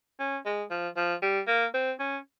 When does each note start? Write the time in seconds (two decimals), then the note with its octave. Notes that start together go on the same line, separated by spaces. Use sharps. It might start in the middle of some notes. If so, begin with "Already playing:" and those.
0.20 C#4
0.45 G#3
0.70 F3
0.96 F3
1.22 G3
1.47 A#3
1.74 C4
1.99 C#4